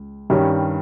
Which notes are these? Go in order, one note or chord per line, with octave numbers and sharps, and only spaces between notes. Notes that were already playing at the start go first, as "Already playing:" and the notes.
Already playing: C#2
G2 D#3 G3 C#4